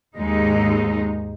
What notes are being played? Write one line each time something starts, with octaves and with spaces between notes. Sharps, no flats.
D#2 G#2 G#3 D#4